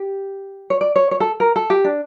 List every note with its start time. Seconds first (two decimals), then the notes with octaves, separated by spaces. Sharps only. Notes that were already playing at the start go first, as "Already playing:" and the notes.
Already playing: G4
0.70 C#5
0.81 D5
0.96 C#5
1.11 C#5
1.20 A4
1.40 A#4
1.56 A4
1.70 G4
1.84 D4